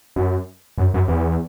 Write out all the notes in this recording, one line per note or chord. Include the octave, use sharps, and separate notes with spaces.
F#2
F#2
F#2
E2